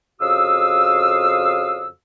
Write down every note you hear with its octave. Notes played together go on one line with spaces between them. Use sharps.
F2 C#3 F#4 F5 D#6 E6